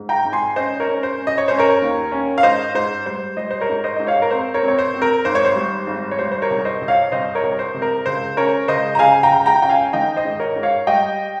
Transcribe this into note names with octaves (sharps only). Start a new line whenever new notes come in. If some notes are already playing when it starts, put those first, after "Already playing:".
Already playing: G#2
G5 A#5
G#1
G#5 C6
C#4 C5 D#5
A#4 C#5
C#4
C5
C#4
D#5
C#5
C#4 C5
A#4 C#5
D#2
C#4
F5
G#2 C5 D#5
G#2 C5
G3 C5
G3 C5 D#5
C5
A#4 C#5
G#2
C5 D#5
G#2 D#5
C#5 F5
A#4
C4 C5
A#4 C#5
C4
C#5
C5
C4
A#4
G#1 C5
C#5
C5
G3
G#1
C#5
G3 C5
C5
A#4 C#5
C2
C5 D#5
C2
C#5 F5
C2 C5 D#5
A#4 C#5
C2
C5
C3
A#4
C#2 C5
C#4 A#4 C#5
C#2 C5 D#5
A#5
C#3 F5 G#5
G5 A#5
C#2
G5 A#5
C#4 G5
F5 G#5
D#3 D#5 G5
C5 D#5
G#2
A#4 C#5
G#2
C#5 F5
G3 D#5 G5